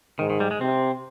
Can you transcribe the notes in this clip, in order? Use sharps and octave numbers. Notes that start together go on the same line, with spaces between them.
G#2 D#3
D#3
G3
G#3
C3 C4